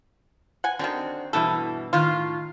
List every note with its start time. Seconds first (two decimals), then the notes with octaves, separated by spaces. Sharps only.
0.64 F#5 G#5
0.79 D3 D#3 C4 F#4
1.33 G2 B2 E3 E4 A4
1.93 A2 D#3 F4 F5